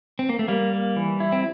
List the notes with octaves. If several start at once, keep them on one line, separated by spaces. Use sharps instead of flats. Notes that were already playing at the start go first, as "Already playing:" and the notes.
C4
A#3
A3
G3 A#3
A#3
E3
E4
C4